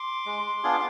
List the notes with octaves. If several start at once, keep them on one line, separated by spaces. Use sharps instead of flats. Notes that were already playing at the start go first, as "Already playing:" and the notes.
Already playing: C6 D6
G#3
B3 D4 F4 G#4